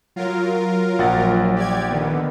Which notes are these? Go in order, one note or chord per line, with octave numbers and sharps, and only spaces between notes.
F#3 F4 A#4
A#1 F#5 A6
G4 D5 G#6
D3 D#3 B3